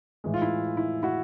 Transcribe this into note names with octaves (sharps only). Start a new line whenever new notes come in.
A2 E3 G#3
F4
E4
E4
E4 F#4